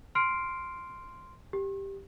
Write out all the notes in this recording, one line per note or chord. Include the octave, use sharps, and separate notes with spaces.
C6 F6 C7 D7
G4